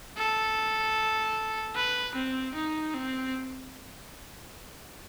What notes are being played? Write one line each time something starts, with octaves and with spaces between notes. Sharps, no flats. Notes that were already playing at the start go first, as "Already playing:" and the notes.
A4
B4
C4
D#4
C4